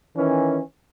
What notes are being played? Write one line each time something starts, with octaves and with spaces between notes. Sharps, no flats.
D#3 E3 C#4